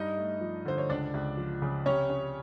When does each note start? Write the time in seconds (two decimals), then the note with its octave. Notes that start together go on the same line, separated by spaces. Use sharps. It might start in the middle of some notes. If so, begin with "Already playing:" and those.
Already playing: G2 D#4 D#5
0.17 A3
0.41 F3
0.65 D3 C5
0.78 C#5
0.89 C#2 D4 D5
1.14 C#2
1.37 F3
1.62 C#3
1.85 C3 C#4 C#5
2.10 C#4